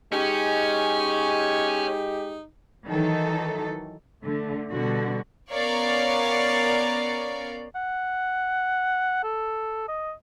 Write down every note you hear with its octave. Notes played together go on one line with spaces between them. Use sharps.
G#3 C#4 D#4 G4
D#3 E3 F#3 D#4 A4
D3 A3
B2 D3 G3 F#4
B3 C#4 A#4 C#5 D5 F5
F#5
A4
D#5